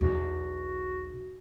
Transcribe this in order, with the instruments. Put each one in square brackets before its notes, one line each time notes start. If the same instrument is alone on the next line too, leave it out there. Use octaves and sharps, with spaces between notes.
[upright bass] B1 E2 [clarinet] F#4